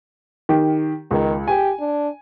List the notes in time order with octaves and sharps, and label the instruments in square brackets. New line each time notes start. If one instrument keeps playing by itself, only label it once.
[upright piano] D#3 G4
[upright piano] C#2 [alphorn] D#3
[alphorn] G4 [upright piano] G#5
[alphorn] D4